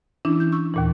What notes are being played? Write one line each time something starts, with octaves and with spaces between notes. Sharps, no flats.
E3 C#4 D4 E4
G6
C#6 E6
D#2 A#2 E3